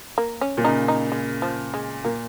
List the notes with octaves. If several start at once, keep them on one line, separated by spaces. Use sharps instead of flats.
A#3
C#4
A#2
C#3 D#4
D#4
G#3
F3
G#3
A#2 A#3